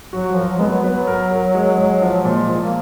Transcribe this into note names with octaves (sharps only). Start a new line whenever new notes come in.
F#3 F#4
F3 A#4
F#3
G#3 B3
F#3
F#3 B3
A#4
A#4
G#3
G#3
F3
A#2 G#3
F3
A#3